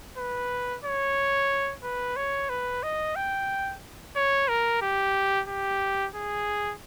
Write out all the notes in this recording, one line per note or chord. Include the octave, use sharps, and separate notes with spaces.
B4
C#5
B4
C#5
B4
D#5
G5
C#5
A#4
G4
G4
G#4